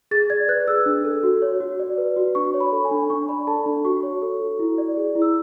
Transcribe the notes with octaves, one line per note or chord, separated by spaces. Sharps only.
G#4 A6
D5 G#6
B4 F#6
G#4 E6
D4
A4
F#4
C#5
F#4
D5
B4
F#4
D4 C#6
C#5
B5
A4
G#5
D4
D4 C#6
D5 B5
A4 A5
D4
F#4 C#6
C#5
A4
F#4
E4
D5
G#4
E4
E6